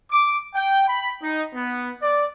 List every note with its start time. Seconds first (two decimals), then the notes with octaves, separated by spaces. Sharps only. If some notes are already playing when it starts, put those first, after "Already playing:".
0.12 D6
0.54 G5
0.89 B5
1.22 D#4
1.55 B3
2.03 D5